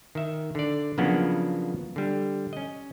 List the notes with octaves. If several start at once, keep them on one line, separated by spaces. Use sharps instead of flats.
D#3 E5
D3 D5
C#3 F3 F#3 A#3 B3 D4
D3 G3
C#4 D#5